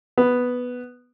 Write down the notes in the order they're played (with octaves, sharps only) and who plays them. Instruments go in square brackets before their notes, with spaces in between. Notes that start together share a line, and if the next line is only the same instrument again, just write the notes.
[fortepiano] B3